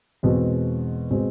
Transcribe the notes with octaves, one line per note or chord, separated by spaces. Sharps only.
E2 B2 G#3 C4
B2 G#3 C4